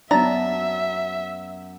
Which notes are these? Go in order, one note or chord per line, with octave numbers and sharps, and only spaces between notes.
F#2 B3 D4 E5 A5 A#5